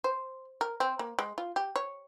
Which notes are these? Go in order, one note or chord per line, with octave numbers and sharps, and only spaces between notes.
C5
A#4
C4
A#3
G#3
F4
G4
C#5